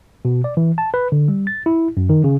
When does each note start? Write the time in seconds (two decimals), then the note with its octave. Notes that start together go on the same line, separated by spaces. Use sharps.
0.25 B2
0.44 D5
0.57 E3
0.78 A5
0.94 B4
1.12 D3
1.28 G3
1.47 A6
1.66 E4
1.97 F#2
2.10 D#3
2.24 C#3